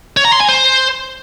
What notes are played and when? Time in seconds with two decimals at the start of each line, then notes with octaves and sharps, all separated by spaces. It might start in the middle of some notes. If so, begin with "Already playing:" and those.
0.17 C#5
0.25 A#5
0.33 C6
0.41 G#5
0.48 C5